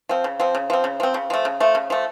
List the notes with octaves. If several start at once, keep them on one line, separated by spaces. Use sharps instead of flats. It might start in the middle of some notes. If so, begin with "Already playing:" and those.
F3 C4
C#3
F3 C4
C#3
F3 C4
C#3
F3 C4
C#3
F3 A3
C#3
F3 A3
C#3
F3 A3